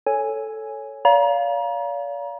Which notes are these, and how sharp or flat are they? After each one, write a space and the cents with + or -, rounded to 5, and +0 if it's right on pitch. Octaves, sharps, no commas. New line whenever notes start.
A4 +0 C#5 +0 G#5 +0
D5 -45 F5 +0 A#5 +30